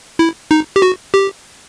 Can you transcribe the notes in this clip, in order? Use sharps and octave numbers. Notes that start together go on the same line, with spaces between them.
E4
D#4
G4
F#4
G4